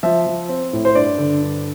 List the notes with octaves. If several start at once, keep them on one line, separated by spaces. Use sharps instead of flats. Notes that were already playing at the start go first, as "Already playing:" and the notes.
F3 E5
F3
C4
A2
C5
G2 D5
D3
G2